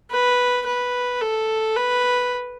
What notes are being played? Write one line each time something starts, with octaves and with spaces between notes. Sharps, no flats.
B4
B4
A4
B4